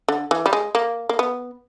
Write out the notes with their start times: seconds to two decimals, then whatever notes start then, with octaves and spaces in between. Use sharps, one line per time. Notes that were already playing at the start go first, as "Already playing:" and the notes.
0.08 D3
0.31 E3
0.46 G3
0.53 G#3
0.75 A#3
1.09 A#3
1.19 B3